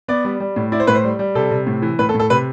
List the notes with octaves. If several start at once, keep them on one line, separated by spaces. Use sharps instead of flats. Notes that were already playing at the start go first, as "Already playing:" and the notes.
B3 D5
G3
G3
A2
E4 D5
C5
A2 B4
C5
G3
G3
C3 A4
C3
A2
E3
A2 B4
A4
A2
A4
C3 B4